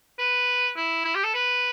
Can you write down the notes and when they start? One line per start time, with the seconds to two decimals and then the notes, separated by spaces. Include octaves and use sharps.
0.19 B4
0.76 E4
1.05 E4
1.15 G4
1.24 A4
1.34 B4